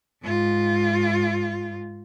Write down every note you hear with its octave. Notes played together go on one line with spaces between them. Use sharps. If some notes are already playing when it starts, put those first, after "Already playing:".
G#2 F4